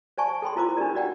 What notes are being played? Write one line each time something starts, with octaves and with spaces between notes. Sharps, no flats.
C5 D5 F#5 G#5 A5 C#6
A4 G5 B5 C6
E4 F4 A#4 C5 D6
D4 D#4 G4 A#4 D5
F#4 D5 F#5 G5